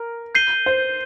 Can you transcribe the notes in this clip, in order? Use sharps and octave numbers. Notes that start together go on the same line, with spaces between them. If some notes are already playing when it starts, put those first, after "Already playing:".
Already playing: A#4
G6 C7 D#7 G7
C5